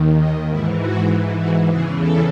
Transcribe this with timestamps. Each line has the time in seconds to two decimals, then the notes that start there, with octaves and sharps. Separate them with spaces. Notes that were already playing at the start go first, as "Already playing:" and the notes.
Already playing: D#2 D#3
0.19 D#4
0.49 G#2 E3 E4
0.80 F#4
1.39 F#4
1.69 E2 C#3 E3 G#4
1.99 A4